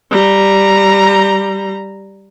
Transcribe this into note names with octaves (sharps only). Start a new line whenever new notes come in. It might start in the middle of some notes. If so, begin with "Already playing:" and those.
G3 A#5